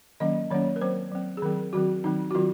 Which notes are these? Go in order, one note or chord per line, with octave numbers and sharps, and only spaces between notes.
D#3 F#3 A#3 C#4 D#5
D#3 F#3 A#3 C#4 C#5
A#4
F#3 C4 C5
F#3 C4
G#4
D#3 F#3 C4 A#4
D#3 F#3 C4 F#4
D#3 F#3 C4 D#4
F#4
D#3 F#3 C4 F4